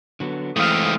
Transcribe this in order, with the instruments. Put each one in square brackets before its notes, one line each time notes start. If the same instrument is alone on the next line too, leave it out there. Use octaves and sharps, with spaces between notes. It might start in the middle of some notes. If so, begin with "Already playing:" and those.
[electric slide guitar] D3 F#3 B3
[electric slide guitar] E3 G#3 [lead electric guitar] A3 C4 [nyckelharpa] F5 D#6